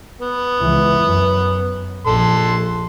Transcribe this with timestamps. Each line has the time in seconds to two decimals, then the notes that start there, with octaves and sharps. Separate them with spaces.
0.21 B3
0.61 C#2 E3
1.02 F#2
2.06 A#1 A4 C6